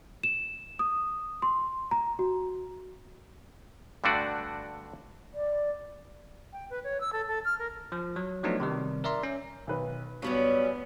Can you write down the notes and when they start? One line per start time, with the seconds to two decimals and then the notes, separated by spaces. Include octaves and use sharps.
0.23 E7
0.79 D#6
1.42 C6
1.91 A#5
2.19 F#4
4.04 G2 D3 A3 D4 F#4 D5
5.34 D5
6.53 G5
6.70 B4
6.84 C#5
7.00 E6
7.13 A4
7.28 A4
7.45 F6
7.59 A#4
7.92 F3
8.16 F#3
8.43 F3 F#3 A3 B3 D4 D#4
8.60 C3 D#3 G3
9.04 A#4 D5 E5 A#5 C6
9.23 C#4
9.67 B1 D#3 B4
10.22 G2 F#3 G3 B3 C#4